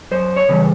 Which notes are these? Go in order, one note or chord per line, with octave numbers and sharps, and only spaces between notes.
F#2 C5
C#5
C#3 E3 G3